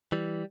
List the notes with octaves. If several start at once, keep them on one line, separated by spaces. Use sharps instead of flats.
E3 G3